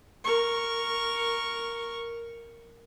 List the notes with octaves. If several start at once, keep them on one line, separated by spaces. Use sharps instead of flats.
A#4 C#6